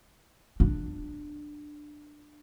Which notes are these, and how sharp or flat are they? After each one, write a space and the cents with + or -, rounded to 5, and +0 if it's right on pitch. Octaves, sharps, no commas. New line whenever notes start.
D4 +15